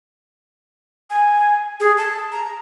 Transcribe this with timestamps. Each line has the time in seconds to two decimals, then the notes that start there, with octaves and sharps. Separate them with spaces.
1.10 G#5
1.80 G#4
1.98 A5
2.32 A#5